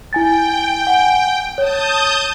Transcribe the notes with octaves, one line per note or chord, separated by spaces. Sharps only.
E4 G5 G#5 A6
F#5 G#5
C#5 A5 D#6 G6